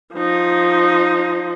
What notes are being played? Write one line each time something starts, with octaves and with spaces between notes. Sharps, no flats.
F3 D#4